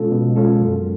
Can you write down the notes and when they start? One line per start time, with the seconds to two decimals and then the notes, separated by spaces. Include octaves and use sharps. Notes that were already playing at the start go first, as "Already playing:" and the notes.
Already playing: B2 G#3 C#4 F4 A4
0.12 B2
0.36 G#3 C#4 F4 A4
0.61 F#2